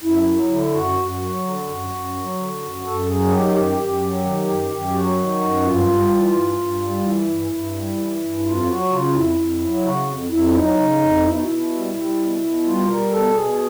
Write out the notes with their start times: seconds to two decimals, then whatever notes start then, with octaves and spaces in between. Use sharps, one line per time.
0.03 F#2 E4
0.26 F#3
0.50 D3
0.73 F#2 F#4
0.97 F#2
1.08 F#4
1.20 F#3
1.43 D3
1.67 F#2
1.90 F#2
2.14 F#3
2.37 D3
2.60 F#2
2.83 F#2 A4
3.07 F#3 G#4
3.30 D#3 G4
3.53 F#2 G4
3.77 F#2
4.00 F#3
4.23 D#3
4.47 F#2
4.70 F#2
4.93 F#3 F#4
5.17 D#3
5.40 F#2
5.63 G2 F4
5.87 G3
6.10 E3
6.33 G2
6.57 G2
6.80 G3
7.03 E3 E4
7.27 G2
7.50 G2
7.74 G3
7.97 E3
8.21 G2
8.44 F2 F4
8.67 F#3 F#4
8.90 C#3 F4
9.13 F2 E4
9.37 F2
9.61 F#3
9.83 C#3 F#4
10.07 F2
10.30 F2 E4
10.49 D4
10.54 F#3 D#4
10.77 C#3
11.01 F2
11.24 B2 E4
11.33 D#4
11.43 B2 E4
11.71 G3
11.93 G3
12.17 B2
12.41 B2
12.64 G3 F4
12.87 G3 A#4
13.10 B2 A4
13.34 B2 G#4